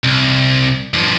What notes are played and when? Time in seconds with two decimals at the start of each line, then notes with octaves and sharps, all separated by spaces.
0.04 C2
0.94 G2 F3